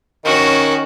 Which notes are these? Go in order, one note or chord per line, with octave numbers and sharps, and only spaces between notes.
D#3 C#4 F#4